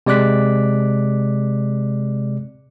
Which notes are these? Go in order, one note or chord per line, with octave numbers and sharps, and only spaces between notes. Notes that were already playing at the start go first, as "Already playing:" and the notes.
C3 G#3 D5 D6 F#6 B6